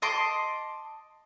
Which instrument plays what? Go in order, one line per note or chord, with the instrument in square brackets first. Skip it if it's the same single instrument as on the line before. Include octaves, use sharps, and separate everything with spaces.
[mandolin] D#5 A5 C6 D6